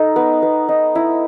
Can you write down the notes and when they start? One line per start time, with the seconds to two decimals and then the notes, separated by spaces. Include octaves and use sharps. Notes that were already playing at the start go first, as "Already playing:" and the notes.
Already playing: D#4 A4
0.16 B3
0.42 B3
0.68 D#4
0.95 E4